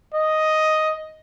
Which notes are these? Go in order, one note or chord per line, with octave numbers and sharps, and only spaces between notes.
D#5